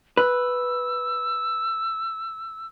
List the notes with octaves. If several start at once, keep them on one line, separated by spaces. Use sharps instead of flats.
B4 E6